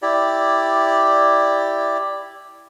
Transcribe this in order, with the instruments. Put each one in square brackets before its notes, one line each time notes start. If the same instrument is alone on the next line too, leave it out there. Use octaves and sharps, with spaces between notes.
[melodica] E4 G4 D5